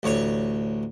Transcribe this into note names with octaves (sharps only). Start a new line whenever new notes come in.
A1 D2 C#5 C#6